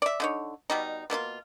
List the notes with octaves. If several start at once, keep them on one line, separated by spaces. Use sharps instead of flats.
D5 E5
D3 D#4 C#5
B2 G3 D#4
B2 A#3 D#4 F4